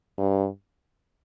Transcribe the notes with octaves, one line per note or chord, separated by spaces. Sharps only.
G2